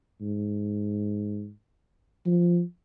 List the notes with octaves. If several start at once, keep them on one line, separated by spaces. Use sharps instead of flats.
G#2
F3